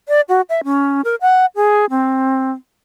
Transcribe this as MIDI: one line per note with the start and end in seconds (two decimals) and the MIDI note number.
0.08 0.21 74
0.29 0.41 66
0.49 0.61 76
0.64 1.01 61
1.04 1.15 70
1.21 1.46 78
1.56 1.86 68
1.90 2.52 60